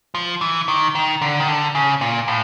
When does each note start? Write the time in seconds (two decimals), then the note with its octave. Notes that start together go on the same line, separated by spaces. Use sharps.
0.15 F3
0.41 E3
0.68 D#3
0.95 D#3
1.22 D3
1.40 D#3
1.48 D3
1.75 C#3
2.01 A#2
2.27 A2